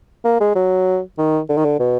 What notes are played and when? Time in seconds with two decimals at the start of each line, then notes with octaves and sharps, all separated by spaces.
0.25 A#3
0.41 G#3
0.56 F#3
1.18 D#3
1.49 D3
1.57 D#3
1.65 D3
1.80 B2